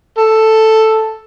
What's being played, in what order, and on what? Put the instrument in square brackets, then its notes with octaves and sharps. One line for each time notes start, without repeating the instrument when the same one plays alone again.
[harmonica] A4